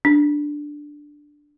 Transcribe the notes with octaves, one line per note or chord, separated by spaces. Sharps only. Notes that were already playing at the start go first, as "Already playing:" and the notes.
D4